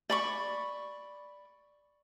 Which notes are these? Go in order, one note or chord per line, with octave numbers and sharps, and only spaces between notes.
D5 B5 C#6